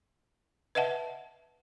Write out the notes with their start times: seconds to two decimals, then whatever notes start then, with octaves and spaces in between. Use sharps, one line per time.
0.75 B4 D#5 E5 F#5 A5